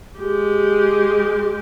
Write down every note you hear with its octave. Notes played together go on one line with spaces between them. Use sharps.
G#3 G4